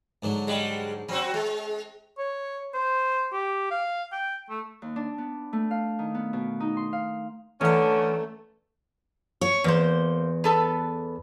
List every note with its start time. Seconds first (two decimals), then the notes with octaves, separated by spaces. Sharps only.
0.22 G#2 D3 F#3
0.47 G3 G#3
1.09 F#3 C4 C#4 F#4
1.34 G#3
2.18 C#5
2.74 C5
3.33 G4
3.71 F5
4.12 G5
4.50 A3
4.82 D#2
4.96 D4
5.18 B3
5.53 A3
5.71 F5
5.99 D#3
6.15 B3
6.33 B2
6.60 D#4
6.77 C6
6.93 F5
7.61 D3 E3 A3 C#4 A#5
9.41 C#5
9.64 E2 A#3 C5
10.44 B3 A4 B4